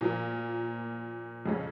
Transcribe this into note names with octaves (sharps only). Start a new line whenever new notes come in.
A#2 F3 A#3
F2 C#3 G#3 C#4